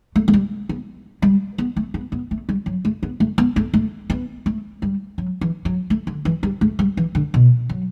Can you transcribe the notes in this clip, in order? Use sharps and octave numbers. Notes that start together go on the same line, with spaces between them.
A3
A3
G3
B3
G3
B3
A3
B3
B3
A3
G3
F#3
A3
B3
A3
B3
A3
A3
B3
A3
G3
F#3
E3
F#3
A3
D3
E3
G3
A3
G3
E3
D3
B2
F#3